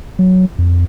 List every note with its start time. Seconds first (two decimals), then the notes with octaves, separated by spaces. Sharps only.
0.19 F#3
0.58 F2